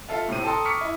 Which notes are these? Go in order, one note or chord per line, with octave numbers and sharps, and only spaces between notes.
F4 A4 E5 F5
A2 C3 C5 D#7
A4 G5 A5 A#5 C6 D#6
C#6 D6 F6 B6 C#7
E4